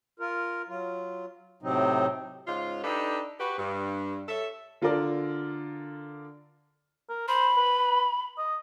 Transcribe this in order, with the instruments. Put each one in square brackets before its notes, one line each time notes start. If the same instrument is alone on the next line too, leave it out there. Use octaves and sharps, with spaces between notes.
[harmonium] F4 A#4
F#3 F4
A2 C3 F#3 C4 D#4
[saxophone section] G#2 C#3 F4
D4 D#4 G4 A4 B4
F#4 G4 B4
G2
A4 C#5 E5
[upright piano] D3 F4 A4 A#4 D5
[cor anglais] A#4
[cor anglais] C5 [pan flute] B5
[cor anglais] B4
D#5